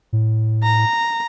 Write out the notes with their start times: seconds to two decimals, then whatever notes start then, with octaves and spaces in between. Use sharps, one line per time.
0.13 A2
0.63 A#5